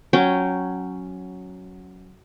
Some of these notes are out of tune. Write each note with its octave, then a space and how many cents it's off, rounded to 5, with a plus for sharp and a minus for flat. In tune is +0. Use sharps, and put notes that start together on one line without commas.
F#3 +0 C#4 +0 G5 -15